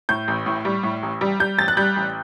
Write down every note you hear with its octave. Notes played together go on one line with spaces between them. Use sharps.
A2 G6
A1
A2
G3
A2
A1
G3
G3 G6
A1 A6
F#6
G3 G6
A1